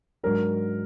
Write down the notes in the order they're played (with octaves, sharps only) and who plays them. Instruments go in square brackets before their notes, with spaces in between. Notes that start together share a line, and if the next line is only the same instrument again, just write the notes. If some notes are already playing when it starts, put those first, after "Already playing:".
[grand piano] G#2 F#3 D4 A#4